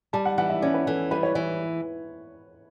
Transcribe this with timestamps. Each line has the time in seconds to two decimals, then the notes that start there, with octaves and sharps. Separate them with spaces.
0.13 G3 A5
0.25 F#5
0.38 E3 F#5
0.50 E5
0.62 C#4 D5
0.74 B4
0.86 E3 A4
1.11 G3 B4
1.23 C#5
1.35 E3 C#5